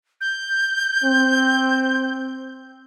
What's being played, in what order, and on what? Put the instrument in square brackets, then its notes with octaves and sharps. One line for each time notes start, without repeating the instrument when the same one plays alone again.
[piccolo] G6
[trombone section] C4